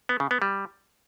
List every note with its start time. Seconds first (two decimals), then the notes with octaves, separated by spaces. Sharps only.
0.09 B3
0.20 C#3
0.31 B3
0.42 G3